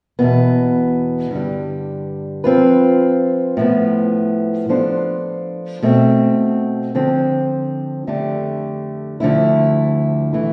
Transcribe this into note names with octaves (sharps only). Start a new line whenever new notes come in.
E2 B2 B3
G2 D3 G3
F3 C4 F4 B4
A2 F3 B3
F3 B3 D4 A4 C5
B2 A3 C4
D3 F3 C4
F2 D3 A3 D4 G4
D2 D3 F3 A3 E4
E3 A3 E4